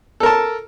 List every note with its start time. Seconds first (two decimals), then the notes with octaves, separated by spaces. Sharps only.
0.20 A4
0.23 A#4
0.26 A5